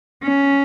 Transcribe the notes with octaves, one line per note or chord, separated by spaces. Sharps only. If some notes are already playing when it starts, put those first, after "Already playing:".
C#4